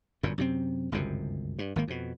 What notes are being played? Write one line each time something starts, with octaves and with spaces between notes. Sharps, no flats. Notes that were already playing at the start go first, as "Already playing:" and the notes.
G1 F#2 A#2
F#2 C3 C4
G1 C#2 F#2 C3
G2
G#1 D#3 A#3
F2 B2